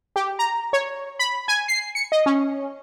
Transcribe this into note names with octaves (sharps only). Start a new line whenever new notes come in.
G4
A#5
C#5
B5
G#5
C7
C#7
D#5
C#4